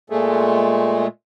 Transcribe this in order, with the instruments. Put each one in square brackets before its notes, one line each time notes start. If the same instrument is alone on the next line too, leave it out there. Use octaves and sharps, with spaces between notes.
[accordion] A#2 G#3 A3